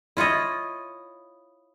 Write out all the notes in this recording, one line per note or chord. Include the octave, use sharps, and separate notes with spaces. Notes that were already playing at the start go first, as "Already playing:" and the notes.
E4 F4 C#5 D#5